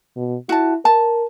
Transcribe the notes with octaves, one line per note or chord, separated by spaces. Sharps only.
B2
E4 F#4 A5
A#4 A5